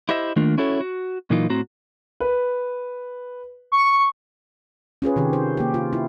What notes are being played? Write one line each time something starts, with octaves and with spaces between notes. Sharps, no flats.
E4 G4 C5 D#5 E5
D#3 A3 A#3 D4 F4
C#4 E4 F#4 A4 C#5
F#4
A#2 E3 F#3 A#3 D#4 F4
A2 C4 F#4 A#5
B4
C#6
C#4 F4 G#4 B4
C3 D#3 G4
C5
A#3 G4
F4
E4